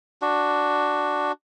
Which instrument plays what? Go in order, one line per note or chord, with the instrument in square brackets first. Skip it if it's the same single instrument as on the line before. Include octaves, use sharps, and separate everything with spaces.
[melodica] D4 F#4